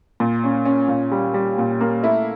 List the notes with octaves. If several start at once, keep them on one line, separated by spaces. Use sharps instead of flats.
A#2
C#4
C#4
A#2
G3
G3
A#2
A#3
A3 E4